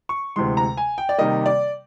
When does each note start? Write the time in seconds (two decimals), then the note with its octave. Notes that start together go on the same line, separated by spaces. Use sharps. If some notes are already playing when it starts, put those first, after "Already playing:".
0.09 C#6
0.36 D2 C3 E3 G#3 C6
0.57 A#5
0.77 G#5
0.98 G5
1.09 D5
1.18 C3 D#3 G3 A#3 D#5
1.46 D5